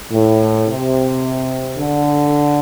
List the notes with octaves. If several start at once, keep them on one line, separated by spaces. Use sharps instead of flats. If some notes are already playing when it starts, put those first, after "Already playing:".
A2
C3
D3